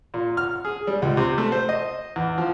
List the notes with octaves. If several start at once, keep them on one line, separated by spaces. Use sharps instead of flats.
A#2
F6
G#4
G3
C#2
C3
A3
C5
D#5
E2
F3